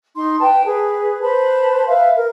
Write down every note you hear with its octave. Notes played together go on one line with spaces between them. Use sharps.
D#4 C6
B4 G5 A5
G#4 B4
B4 C5 A5 B5
B4 E5 F5
A#4